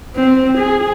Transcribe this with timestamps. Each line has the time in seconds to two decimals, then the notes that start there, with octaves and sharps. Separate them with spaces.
0.16 C4
0.58 G#4